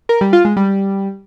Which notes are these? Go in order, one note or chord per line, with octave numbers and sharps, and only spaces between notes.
A#4
G3
F4
G#3
G3